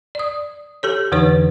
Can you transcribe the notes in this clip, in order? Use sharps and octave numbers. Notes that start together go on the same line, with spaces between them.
D5 D#6
G4 A4 C#5
F2 D3 E3 D#4 B4 C#5